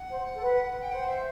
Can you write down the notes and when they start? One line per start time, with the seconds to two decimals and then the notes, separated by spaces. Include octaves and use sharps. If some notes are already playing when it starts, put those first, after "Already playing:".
Already playing: F#5
0.10 C5
0.34 A4
0.42 B4
0.83 G5
0.92 C5 F#5
1.08 E5